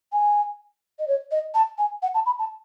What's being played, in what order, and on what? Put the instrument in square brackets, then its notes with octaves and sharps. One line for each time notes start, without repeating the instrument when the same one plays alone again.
[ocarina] G#5
D#5
C#5
D#5
A5
G#5
F#5
A5
B5
A5